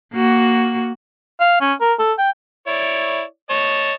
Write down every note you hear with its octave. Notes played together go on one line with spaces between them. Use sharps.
A#3 F#4
F5
C#4
A#4
A4
G5
E4 C#5 D5
C#5 D#5 A5